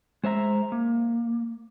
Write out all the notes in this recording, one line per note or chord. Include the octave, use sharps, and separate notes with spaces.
G#3 C5 E5 A#5
A#3